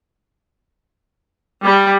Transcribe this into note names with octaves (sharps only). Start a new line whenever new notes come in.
G3